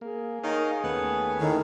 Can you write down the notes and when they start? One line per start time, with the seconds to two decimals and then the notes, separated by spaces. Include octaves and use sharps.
0.01 A#3 G#4
0.44 D#3 C#5 D#5 F5
0.84 D#2 A3 B3 C#4
1.40 A2 D#3